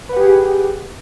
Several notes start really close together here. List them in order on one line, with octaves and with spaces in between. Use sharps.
B4 F#5 G4 G#4